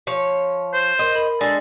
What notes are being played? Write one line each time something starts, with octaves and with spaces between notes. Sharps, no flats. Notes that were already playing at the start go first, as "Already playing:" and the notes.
F3 C#5
C5
A#4 D#5 C6
A#4 B5 F#7
G#3 D4 G#4 A4 D5